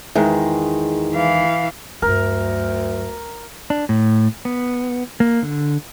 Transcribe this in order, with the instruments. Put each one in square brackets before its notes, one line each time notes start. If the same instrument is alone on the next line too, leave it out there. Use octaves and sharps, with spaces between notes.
[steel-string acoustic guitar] E2 D#3 G#3
[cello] E3 F5
[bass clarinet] D2 [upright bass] G2 F#3 [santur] A#4
[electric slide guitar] D4
A2
B3
A#3
D3